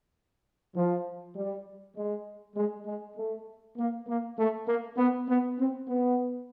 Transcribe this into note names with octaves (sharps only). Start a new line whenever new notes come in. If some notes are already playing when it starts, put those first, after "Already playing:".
F3
G3
G#3
G#3
G#3
A3
A#3
A#3
A3
A#3
B3
B3
C4
B3